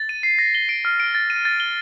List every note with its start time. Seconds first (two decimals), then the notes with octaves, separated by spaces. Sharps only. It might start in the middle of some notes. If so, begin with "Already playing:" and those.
Already playing: A6
0.09 D#7
0.23 C7
0.39 A#6
0.55 G7
0.69 D7
0.85 F6
1.00 D7
1.15 A6
1.30 D#7
1.45 A6
1.60 G7